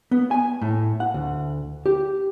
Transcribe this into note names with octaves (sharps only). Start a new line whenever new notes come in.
B3
G#5
A2
F#5
D2
G4